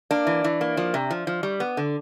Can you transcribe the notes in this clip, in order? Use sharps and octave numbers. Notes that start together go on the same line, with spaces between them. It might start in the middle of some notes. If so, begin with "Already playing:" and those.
A#3 D4
E3
E3
A#3
F3
C3
F3
F3
G3
B3
D3